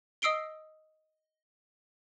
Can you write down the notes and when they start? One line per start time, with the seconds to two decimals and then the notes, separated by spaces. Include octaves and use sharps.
0.22 D#5 D#6 E6 C7 D7 G7